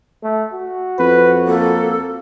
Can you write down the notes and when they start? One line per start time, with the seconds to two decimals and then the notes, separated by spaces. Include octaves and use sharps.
0.23 A3
0.53 F#4
0.99 F2 B4
1.47 A#3 A4